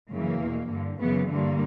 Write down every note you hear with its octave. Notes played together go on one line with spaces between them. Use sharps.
F#2 C#3 E3 A#3
E2 B2
G2 D3
F#2 C#3 E3 B3
G2 D3 A#3